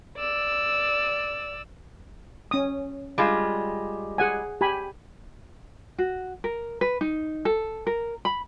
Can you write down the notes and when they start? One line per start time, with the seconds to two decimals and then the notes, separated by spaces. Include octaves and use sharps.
0.17 D5 E6
2.51 C#4 D#6
3.18 G3 G#3 F4
4.18 G#4 F#5 G#5
4.61 G4 G#5 B5
5.98 F#4
6.44 A#4
6.81 B4
7.01 D#4
7.45 A4
7.87 A#4
8.25 B5